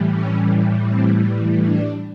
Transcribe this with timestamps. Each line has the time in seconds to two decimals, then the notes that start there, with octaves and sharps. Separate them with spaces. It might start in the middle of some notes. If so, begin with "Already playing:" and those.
Already playing: A2 E3 G3
0.12 C#4
0.88 C4
1.64 D4